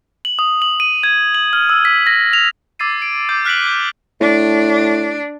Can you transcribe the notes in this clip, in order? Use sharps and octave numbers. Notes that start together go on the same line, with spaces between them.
F#7
D#6
F#7
D#7
G#6
F#7
F6
E6
B6
A#6
F7
D6 E6 G#6 A6 C7 D#7
D7
D6 G6
F6 F#6 B6 D7 F#7
G6
A2 D4